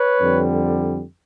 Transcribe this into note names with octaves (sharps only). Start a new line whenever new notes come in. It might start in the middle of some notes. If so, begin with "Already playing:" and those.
Already playing: B4 C#5
F2 D3 G3